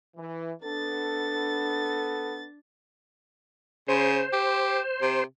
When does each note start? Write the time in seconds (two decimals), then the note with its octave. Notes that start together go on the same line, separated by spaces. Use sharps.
0.17 E3
0.63 B3 D4 A4 A6
3.88 C#3 C5
4.33 G4
5.02 C3